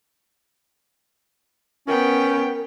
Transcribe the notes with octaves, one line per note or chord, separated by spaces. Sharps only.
B3 C#4 A#4 G5